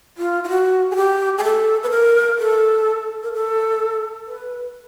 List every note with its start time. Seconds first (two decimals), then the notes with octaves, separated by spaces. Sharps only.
0.18 F4
0.44 F4
0.49 F#4
0.91 G#4
0.96 G4
1.38 G#4
1.44 A4
1.83 B4
1.91 A#4
2.38 A4
3.23 A#4
3.33 A4
4.27 B4